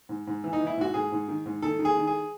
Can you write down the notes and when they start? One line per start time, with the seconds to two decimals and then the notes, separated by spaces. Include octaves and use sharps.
0.09 G#2
0.27 G#2
0.44 E3
0.53 D#4
0.61 E3
0.67 E4
0.77 G#2 F#4
0.94 G#2 G#4
1.12 G#2
1.28 D#3
1.46 G#2
1.62 D#3 A4
1.79 D#3
1.85 G#4
1.97 D#3
2.07 G#4